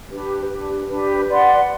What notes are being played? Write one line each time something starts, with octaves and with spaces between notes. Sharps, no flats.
D4 G4 B4
D4 G4 B4
D4 G4 B4
B4 D5 F#5 C6